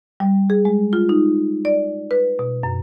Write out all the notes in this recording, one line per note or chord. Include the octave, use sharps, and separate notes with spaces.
G3
G#4
G#3
F4
D#4
D5
B4
B2
F#2